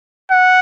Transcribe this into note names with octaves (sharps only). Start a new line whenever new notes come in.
F#5